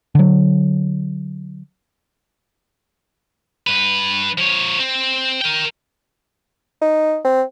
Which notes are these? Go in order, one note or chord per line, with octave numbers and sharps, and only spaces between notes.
D3 F#3
G2 B4
F3 C#5
C4
A#4 G5
D#4
C4